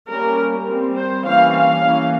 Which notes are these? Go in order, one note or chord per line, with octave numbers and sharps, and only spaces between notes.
G3 A#3 C#4 A#4
G3 C4
C5
E3 G3 A#3 C#4 F5
F5
E3 A#3 C#4